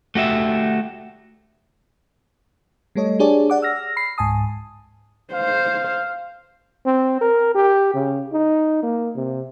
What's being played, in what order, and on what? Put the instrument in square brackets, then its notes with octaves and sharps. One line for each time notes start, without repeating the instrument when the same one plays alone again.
[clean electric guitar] A3 F#4 G4 E5
[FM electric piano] G3 A3 A4 C#5 D#5
D4 G4 G#4 C#5 D5 A5
D5 F#5 D6
E6 F6 A#6
B5 C7
C#2 G#2 G#5 A5 D#6
[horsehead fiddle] C5 [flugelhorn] F5
[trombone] C4
A#4
G4
C#3
D#4
A#3
C3